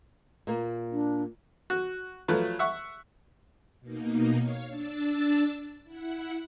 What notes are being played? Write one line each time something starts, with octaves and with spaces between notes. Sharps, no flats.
A#2 A#3
D4
F#4
F3 F#3 A3 B4
E5 F#5 C#6
B2 A#3 D#4
C#5 F5
D4 E6 A6
E4 F#5